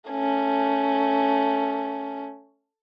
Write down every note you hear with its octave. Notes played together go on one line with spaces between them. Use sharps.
A3 C#4